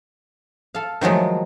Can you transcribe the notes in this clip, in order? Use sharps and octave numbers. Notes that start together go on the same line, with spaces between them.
A4 F5
D#3 F3 F#3 G#3 A3